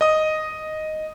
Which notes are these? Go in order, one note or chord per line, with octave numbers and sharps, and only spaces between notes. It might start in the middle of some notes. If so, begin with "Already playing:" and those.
D#5 D#6